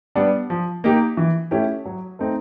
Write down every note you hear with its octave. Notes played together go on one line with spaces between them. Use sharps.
G3 B3 D4
F3
A#3 D#4 G4
E3
A3 C#4 E4 G4
F#3
A3 C4 D#4